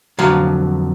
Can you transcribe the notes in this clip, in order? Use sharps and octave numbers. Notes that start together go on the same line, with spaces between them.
F2 D3 F#3 F5